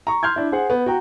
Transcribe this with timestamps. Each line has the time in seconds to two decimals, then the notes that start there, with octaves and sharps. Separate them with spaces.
0.07 A#5 C#6
0.23 C6 F6 G6 G#6
0.36 D4 E4
0.52 G#4 C5 F#5
0.70 B3
0.86 F#4 G5 A#5